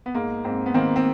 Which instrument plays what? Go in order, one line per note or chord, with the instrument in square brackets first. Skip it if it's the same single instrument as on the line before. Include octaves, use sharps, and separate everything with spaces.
[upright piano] B3
G#2 G#3 A#3
G#2 A#3 C4
B3
D#3 A#3 C4
C4